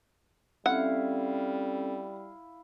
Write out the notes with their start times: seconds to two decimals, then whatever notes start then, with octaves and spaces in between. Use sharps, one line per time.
0.66 G3 C4 C#4 E4 A4 F5 F#5